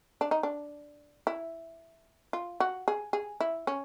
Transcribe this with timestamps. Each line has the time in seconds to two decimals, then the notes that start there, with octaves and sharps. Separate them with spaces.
0.21 D4
0.31 D#4
0.43 D4
1.27 E4
2.33 F4
2.60 F#4
2.88 G#4
3.13 G#4
3.41 E4
3.67 C#4